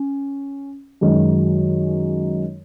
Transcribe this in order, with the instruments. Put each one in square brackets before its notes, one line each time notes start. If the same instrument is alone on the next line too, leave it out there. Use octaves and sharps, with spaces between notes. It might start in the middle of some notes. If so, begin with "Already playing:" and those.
Already playing: [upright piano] C#4
F#2 D#3 G#3 D#4 F#4